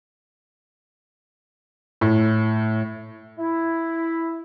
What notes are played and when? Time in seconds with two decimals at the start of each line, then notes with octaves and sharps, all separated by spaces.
2.01 A2
3.39 E4